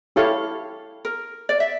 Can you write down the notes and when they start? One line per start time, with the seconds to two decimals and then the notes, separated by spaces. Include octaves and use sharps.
0.16 E4 G4 A4 C#5 F5
1.05 A#4
1.49 D5
1.60 E5